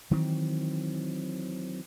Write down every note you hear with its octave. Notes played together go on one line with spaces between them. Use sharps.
D#3 E3 F#3 C4